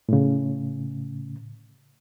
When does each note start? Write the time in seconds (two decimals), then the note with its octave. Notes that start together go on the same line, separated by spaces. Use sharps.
0.09 A2 C#3